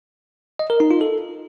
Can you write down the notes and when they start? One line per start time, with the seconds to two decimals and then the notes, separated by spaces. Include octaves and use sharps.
0.59 D#5
0.70 A#4
0.80 D#4
0.91 F4
1.01 A4